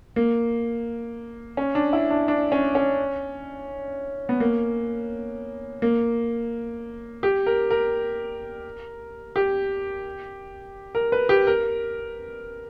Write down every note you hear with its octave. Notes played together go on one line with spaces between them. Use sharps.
A#3
C#4
D4
E4
D4
D4
C#4
C#4
B3
A#3
A#3
G4
A#4
A#4
G4
A#4
B4
G4
A#4